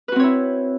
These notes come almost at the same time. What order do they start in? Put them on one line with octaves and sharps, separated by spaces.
B4 F#4 C4 C#5 E4